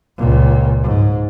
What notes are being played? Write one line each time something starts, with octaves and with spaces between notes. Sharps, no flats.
C#2 A#2
G#2